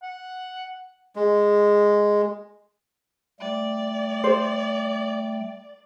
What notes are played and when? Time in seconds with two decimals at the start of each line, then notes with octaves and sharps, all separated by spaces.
0.02 F#5
1.16 G#3
3.40 G3 A3 D5 G5
4.24 C5